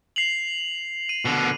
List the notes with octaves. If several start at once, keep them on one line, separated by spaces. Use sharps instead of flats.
C7 F7 F#7
D#7
B2 D3